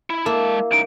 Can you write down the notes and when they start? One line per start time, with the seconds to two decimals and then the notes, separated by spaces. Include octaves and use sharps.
0.10 E4
0.26 G#3 A#3 E4 A5
0.71 C#2 D#4 D7